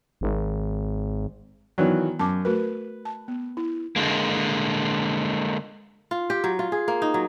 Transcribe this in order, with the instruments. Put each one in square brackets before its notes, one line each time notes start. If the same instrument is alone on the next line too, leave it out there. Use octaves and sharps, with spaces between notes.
[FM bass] G#1
[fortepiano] D#3 E3 F#3 [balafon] B3 D5
[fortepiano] F#2 [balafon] A5 D6
[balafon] A3 F#4 A#4 [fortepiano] B4
[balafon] A5
B3
E4
[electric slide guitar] D3 G#3 A#3
[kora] F4
G4
F#3
F4
G#4
A#3
D#4
F#3